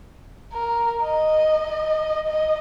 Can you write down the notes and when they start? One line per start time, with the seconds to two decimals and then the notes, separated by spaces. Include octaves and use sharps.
0.53 A#4
1.03 D#5
2.28 D#5